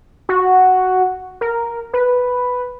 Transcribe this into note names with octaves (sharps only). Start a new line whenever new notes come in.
F#4
A#4
B4